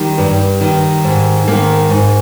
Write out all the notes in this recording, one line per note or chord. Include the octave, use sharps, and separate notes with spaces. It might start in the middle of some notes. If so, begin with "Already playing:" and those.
Already playing: D#3 G3
G2
D#3
G#2
D#3 A#3
G#2